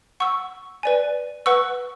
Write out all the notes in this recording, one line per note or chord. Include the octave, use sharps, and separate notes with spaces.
F#5 C#6 E6
B4 D5 G#5
B4 F#5 C#6 E6